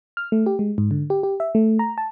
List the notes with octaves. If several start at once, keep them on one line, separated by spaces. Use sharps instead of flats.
F6
A3
G4
G#3
G#2
D3
G4
G4
E5
A3
A#5
A5